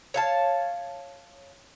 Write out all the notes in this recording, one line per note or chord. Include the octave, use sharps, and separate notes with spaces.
C#5 F5 A5